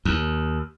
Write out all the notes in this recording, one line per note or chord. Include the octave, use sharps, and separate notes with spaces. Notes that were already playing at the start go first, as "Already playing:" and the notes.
D#2